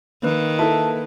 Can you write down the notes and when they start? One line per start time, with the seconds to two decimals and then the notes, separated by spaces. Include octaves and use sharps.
0.23 D#3 A#3 B4
0.59 E4 A4 A5